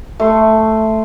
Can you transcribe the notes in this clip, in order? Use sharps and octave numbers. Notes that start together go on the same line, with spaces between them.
A3 C6